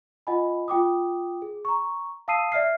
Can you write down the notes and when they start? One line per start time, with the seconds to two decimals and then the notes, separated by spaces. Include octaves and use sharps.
0.27 F4 D#5 F#5 G#5 B5
0.68 F4 G5 D6 D#6
1.42 G#4
1.65 A#5 C#6
2.28 F5 A5 D#6 E6 C7 D#7
2.52 D5 E5 F6 C7